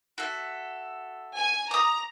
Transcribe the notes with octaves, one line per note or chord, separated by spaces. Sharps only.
F#4 A4 E5
G#5
A#5 D6 D#6